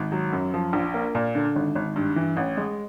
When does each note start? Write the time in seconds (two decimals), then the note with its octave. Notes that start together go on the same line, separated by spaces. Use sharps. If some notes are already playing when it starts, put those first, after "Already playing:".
Already playing: G#1
0.12 F#3
0.33 F#2
0.54 F3
0.73 A#1
0.94 A#3
1.15 A#2
1.35 D3
1.56 G#1
1.75 G#1
1.96 G2
2.16 E3
2.37 A1
2.57 G#3